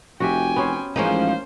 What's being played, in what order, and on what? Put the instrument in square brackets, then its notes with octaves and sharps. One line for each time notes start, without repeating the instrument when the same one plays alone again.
[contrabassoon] F1 [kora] F#4 G4 E5 [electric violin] G5 G#5
[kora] B3 C#4 C5
[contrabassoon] A1 [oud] F3 G#3 D#4 [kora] A#3 C#4 [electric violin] C5